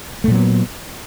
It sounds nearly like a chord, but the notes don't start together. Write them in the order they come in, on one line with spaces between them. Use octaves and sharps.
A3 A#2 F#3 B3